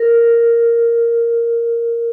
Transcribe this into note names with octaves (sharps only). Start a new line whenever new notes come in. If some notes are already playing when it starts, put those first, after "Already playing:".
Already playing: A#4